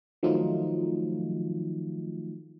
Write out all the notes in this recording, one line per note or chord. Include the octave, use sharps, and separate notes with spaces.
D#3 F3 F#3 A3 D#4 F4